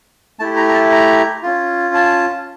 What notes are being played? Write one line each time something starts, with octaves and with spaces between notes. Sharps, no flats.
A3 E4 G4 A5
A#5
A#5
A5
A#5
C#4 F4
A5